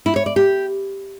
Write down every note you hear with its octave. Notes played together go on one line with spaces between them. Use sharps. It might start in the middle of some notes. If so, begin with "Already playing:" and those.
E4
C#5
D5
G4